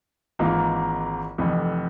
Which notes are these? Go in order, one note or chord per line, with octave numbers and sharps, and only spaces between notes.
G#1 G#2 E3 A#3 F4
F1 F2 E3